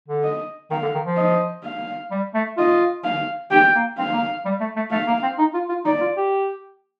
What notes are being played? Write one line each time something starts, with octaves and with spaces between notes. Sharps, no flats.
D3
D#5
D#3 F5
D3
D#3
F3
D#5
F5
G3
A3
F4 D#5
F5
G4 G5
A#3
C4 F5
A#3
G3
A3
A3
A3 F5
A#3
C4
D#4
F4
F4
D#4 D5
F4
G4